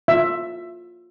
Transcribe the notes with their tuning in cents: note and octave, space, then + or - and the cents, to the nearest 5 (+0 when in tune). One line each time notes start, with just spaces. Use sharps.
F4 +20 E5 +10